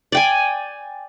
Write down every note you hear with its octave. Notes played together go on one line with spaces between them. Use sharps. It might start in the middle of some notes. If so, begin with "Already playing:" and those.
D5 G5 G#5